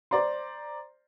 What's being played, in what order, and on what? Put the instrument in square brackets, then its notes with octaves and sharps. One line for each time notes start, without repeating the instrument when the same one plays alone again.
[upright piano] C5 D5 A#5 C6